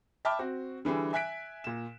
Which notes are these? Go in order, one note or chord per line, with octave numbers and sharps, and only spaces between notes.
E5 G5 A5 B5 D6 F6
C4 F#4
D3 E3 G3 G#4
E5 G#5 F#6 B6 D7
A#2 E7